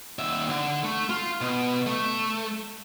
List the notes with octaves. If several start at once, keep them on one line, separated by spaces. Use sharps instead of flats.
D#2 E5
D3
A3
F4
B2
A3